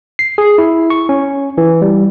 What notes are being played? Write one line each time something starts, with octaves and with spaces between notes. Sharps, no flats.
C7
G#4
E4
C#6
C#4
E3
G3